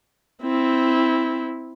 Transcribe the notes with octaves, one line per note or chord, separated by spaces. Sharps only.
C4 E4